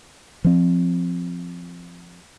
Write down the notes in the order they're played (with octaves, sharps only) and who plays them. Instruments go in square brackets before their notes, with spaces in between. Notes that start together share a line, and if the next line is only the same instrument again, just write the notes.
[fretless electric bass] F3 C4